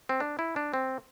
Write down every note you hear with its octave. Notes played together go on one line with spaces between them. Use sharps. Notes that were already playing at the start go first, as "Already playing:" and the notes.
C4
D4
E4
D4
C4